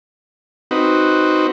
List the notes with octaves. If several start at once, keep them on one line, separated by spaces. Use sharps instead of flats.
C4 D#4 F#4 B4